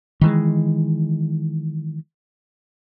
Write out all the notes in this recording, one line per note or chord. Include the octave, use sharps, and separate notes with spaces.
D#3 E3 G#3